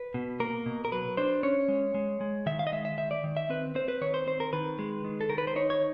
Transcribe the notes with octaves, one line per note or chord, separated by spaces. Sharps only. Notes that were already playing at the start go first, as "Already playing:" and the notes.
Already playing: B4
B2
A#3 A#4
B2
A#4
F#3 B4
D4 C5
C#4 C#5
G#3
G#3
G#3
D#3 E5
F5
D#5
G#3 E5
E5
D#3 E5
D5
D#3
E5
C4 B4
C4 C5
B4
D#3 C#5
C5
C4 C5
A#4
D#3 B4
G#3
D#3
A4
D#3 A#4
B4
C5
D#4 C#5
C#5